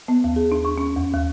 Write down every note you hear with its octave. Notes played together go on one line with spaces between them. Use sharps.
B3
D#2
G#4
D4
C#6
C#4
E2
D#2